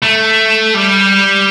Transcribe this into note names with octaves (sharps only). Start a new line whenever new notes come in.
A3
G3